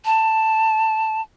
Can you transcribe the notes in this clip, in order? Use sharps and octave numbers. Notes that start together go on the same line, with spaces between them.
A5